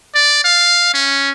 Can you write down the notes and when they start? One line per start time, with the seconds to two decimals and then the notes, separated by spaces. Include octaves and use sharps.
0.15 D5
0.44 F5
0.94 C#4